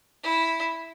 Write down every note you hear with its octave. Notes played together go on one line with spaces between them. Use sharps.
E4